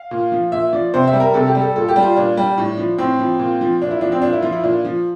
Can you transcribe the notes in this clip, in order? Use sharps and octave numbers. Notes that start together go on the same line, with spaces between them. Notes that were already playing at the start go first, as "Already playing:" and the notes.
Already playing: F5
A#2
F3
A#2 E5
F3 D5
C3 C5
E5
G3
A#4
C3 A4
G4
G3
A4
A#2 A4
G4
G3
F4
A#2 D4
G3
A2
F3
A2 C4
F3
A#2
F3
A#2 D4
E4
F3 D4
C4
A#2 D4
E4
F3 F4
E4
A#2 D4
F3